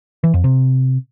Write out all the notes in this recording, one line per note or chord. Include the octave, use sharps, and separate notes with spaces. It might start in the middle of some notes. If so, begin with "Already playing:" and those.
E3
F2
C3